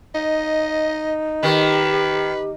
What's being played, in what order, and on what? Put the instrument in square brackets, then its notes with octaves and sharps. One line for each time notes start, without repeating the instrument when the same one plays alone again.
[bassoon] D#4 [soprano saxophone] D#5
[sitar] D#3 [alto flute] G4 [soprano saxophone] B4